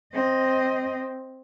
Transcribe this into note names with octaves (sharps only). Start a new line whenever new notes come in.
C4 D#5